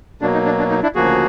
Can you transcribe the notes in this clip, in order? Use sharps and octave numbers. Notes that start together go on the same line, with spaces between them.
B2 F#3 A#3 D4
D#4
D4
D4
D#4
D4 E4
D2 C#3 F3 A#3 F#4 G#4